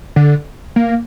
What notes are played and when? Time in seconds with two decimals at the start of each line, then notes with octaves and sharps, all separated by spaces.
0.16 D3
0.76 A#3